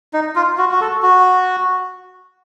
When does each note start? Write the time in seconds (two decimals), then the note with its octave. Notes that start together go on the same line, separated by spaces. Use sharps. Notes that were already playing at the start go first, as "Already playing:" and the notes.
0.14 D#4
0.36 F4
0.58 F#4
0.71 F#4
0.81 A4
1.02 F#4